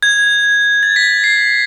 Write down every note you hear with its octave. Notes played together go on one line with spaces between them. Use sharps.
G#6
A6
B6
A6
C7